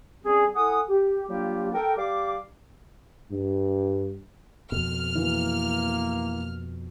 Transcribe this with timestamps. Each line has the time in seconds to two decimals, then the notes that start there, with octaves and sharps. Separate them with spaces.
0.23 G3 C4 C#4 G#4
0.55 E4 A4 F#5 G#5 D#6
0.89 G4
1.29 F#3 G3 A#3 D4 F4 G4
1.73 A4 A#4 G5
1.97 G3 G4 D5 F5 D6
3.32 G2
4.72 F2 B2 F6
5.15 E3 A#3